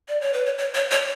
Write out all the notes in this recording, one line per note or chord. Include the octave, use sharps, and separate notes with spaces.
D5
C#5
B4
C#5
C#5
C#5
C#5